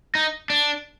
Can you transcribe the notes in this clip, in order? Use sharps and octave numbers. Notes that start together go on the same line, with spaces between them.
D#4
D4